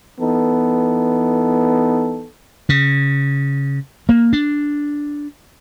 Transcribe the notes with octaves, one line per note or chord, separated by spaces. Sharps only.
E3 B3 D#4 A4
C#3
A#3
D4